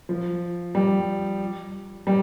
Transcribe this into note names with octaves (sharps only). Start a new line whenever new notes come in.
F3
G3
G3